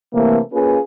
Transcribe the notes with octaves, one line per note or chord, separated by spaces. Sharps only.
C3 E3 A3 A#3
A#3 C#4 F4 G#4 B4